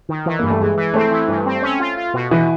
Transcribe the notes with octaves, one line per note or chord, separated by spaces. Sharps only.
D#3
E3
G2 A#3
A3
E3 G#3
E3
A3 C4
E3
G2
C4
C#4
F4
F4
B2
B2 E3